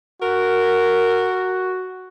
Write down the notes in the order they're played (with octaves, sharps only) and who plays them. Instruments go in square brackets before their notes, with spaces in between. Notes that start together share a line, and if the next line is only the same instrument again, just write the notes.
[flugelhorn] F#4 [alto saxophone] A#4